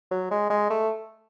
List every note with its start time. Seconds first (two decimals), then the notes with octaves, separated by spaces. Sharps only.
0.11 F#3
0.31 G#3
0.50 G#3
0.70 A3